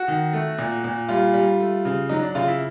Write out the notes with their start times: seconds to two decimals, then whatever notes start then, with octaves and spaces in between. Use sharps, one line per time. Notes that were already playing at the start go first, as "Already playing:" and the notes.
Already playing: F#4
0.08 D#3
0.33 A3
0.58 A#2
0.84 A#2
1.09 G3 F4
1.34 G3
1.60 A3
1.85 C#3
2.09 F#3 D#4
2.22 D4
2.35 C#3 F4
2.48 E4